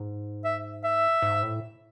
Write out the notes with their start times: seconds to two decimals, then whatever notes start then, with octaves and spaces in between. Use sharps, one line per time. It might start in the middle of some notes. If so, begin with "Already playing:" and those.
Already playing: G#2
0.44 E5
0.84 E5
1.22 G#2
1.42 A2